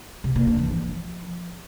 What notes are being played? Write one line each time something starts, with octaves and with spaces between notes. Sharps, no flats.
C3
A#3
D4
E3
F3